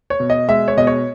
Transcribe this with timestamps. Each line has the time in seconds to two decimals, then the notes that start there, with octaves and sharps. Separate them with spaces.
0.10 C#5
0.20 B2
0.30 D#5
0.48 G#3 E5
0.68 C#5
0.77 B2 D#5
0.87 C#5